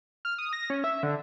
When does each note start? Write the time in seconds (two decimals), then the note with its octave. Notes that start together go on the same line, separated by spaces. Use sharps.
0.25 F6
0.38 D#6
0.53 A#6
0.70 C#4
0.84 E5
1.03 D3